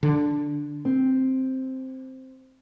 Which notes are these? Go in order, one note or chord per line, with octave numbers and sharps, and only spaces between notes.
D3
C4